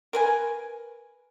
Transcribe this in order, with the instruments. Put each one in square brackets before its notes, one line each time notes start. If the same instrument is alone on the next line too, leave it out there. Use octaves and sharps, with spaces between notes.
[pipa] A#4 B4 G#5